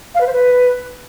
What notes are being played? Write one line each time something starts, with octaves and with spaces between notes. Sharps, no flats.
F5
B4
C5
B4